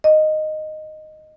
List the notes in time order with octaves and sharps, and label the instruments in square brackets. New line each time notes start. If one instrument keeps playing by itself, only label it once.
[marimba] D#5